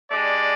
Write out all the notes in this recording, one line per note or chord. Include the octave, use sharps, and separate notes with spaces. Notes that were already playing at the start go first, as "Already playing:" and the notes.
G#3 D4 G4 D5